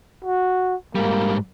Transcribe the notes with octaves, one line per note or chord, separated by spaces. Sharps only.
F#4
G#2 G3 A#3